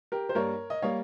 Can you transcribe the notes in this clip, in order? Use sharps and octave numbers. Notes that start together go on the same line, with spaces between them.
G4 A#4
C5
G2 G3 A#3 A#4 C#5
D#5
G3 A#3 C#5 F5